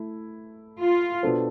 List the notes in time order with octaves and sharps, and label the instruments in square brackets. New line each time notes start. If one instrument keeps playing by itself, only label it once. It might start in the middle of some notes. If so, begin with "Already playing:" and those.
Already playing: [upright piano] A3 E4
[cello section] F4
[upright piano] B2 B3 D4 A4 C5